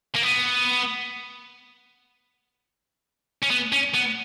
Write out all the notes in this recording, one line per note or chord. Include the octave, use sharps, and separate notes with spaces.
A#3
B3
C#4
B3
C#4
B3